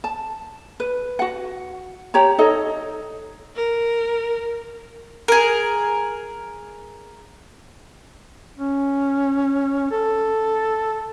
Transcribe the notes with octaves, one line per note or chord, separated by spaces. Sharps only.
A5
B4
F#4 F#5
G4 C#5 A#5
D#4 A4 C#5 D#5
A#4
G#4 A#4
C#4
A4